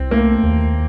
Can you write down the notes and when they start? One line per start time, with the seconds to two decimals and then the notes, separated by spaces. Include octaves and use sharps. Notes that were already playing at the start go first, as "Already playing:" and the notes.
Already playing: C2 C4
0.11 A3 A#3
0.43 D#2